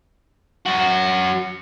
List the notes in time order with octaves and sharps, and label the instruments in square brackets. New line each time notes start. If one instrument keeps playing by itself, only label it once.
[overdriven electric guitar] F#2 F#4